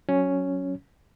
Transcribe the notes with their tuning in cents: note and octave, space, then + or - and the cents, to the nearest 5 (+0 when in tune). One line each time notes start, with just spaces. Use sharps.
F#3 +0 C#4 +0